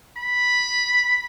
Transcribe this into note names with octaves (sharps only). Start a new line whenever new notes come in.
B5